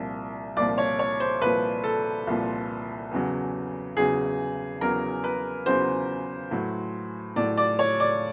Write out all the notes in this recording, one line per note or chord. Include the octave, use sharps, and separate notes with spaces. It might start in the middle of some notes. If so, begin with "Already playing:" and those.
Already playing: C2 A#2 F3
C2 A#2 F3 D5
C#5
C#5
C5
C2 A#2 F3 B4
A4
C2 A#2 F3
E2 C#3 F#3
E2 C#3 F#3 G#4
E2 C#3 F#3 A#4
B4
E2 C#3 F#3 C5
A2 F#3
A2 F#3 D5
D5
C#5
D5